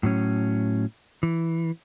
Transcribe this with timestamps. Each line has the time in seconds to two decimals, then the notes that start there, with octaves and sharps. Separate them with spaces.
0.03 A2 F#3 C#4
1.23 E3